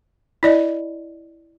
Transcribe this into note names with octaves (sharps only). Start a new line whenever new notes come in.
E4 D5 D#5